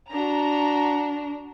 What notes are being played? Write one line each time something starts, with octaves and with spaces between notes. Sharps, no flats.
D4 F#4 A#5